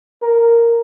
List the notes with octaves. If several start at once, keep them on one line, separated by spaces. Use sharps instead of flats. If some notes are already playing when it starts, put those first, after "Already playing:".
A#4